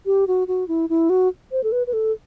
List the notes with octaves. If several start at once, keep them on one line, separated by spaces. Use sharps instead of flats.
G4
F#4
F#4
E4
E4
F#4
C5
A4
B4
B4
A4